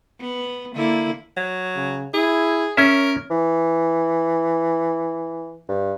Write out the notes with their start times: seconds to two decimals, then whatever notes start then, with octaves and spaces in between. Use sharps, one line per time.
0.20 B3
0.75 D3 A#3 E4
1.37 F#3
1.75 C#3
2.14 E4 G#4
2.77 C#4 A#4 C#5 E5
3.30 E3
5.68 G2